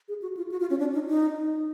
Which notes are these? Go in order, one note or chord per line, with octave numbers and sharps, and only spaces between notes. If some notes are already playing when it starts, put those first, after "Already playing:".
G#4
F#4
F4
F#4
F4
C#4
D4
D#4
D#4